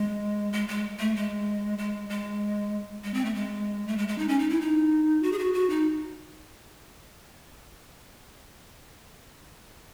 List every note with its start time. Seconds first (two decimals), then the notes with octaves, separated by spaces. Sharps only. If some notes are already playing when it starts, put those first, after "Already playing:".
Already playing: G#3
0.53 G#3
0.68 G#3
0.99 A3
1.16 G#3
1.78 G#3
2.09 G#3
3.04 G#3
3.14 C4
3.25 A3
3.35 G#3
3.88 A3
3.98 G#3
4.08 G#3
4.18 D#4
4.28 C#4
4.39 D#4
4.50 E4
4.61 D#4
5.23 F#4
5.32 G#4
5.39 F#4
5.54 F#4
5.70 D#4